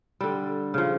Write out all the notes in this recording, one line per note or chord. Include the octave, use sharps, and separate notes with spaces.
D3 G3
C#3 F3